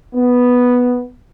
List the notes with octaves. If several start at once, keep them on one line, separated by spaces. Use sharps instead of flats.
B3